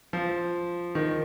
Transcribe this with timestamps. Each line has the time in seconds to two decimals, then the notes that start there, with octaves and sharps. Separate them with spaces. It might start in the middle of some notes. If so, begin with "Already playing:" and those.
0.13 F3
0.95 D#3